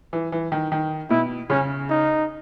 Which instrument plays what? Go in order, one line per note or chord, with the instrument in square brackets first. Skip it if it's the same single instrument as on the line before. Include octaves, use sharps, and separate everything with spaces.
[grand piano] E3
E3
D#3
D#3
[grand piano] B2 [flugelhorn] E4
[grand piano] C#3 [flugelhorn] C#4
[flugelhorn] D#4